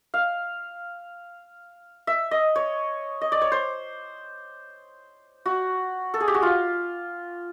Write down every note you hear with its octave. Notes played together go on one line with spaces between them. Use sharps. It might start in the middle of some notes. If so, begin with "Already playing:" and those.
F5
E5
D#5
C#5
D#5
D5
C#5
C5
F#4
A4
G#4
G4
F#4
F4